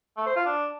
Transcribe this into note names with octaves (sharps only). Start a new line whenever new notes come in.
A3
C5
F4
D4